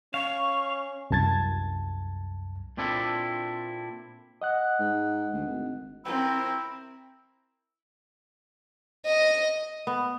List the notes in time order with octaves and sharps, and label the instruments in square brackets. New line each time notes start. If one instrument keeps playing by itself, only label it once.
[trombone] C#4 [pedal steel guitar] F5 [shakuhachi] C#6
[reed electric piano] C2 F#2 A5 G#6 A6
[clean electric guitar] A#2 C4 D4 E4 A4
[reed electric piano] D#5 F#5 F#6
[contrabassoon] G#2
D2
G#1
[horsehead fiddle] C4 A#4 [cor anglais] E4
[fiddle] D#5
[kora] B3